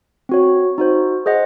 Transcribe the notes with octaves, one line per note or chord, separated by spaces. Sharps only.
C4 F#4 C#5
D#4 F#4 C5
G#4 C5 D#5 F#5